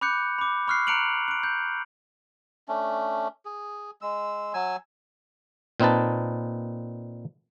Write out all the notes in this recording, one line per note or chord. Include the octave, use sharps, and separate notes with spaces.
B5 D6 F#6 G6 C#7
B5 D6
B5 C#6 F6 F#6 C7
A#5 F#6 C#7 D7 F7 F#7
F#6 D7
G6
A3 C#4 D4
G#4
G#3 E6
F#3 G#5 E6
A#2 C4 D#4 B4 A5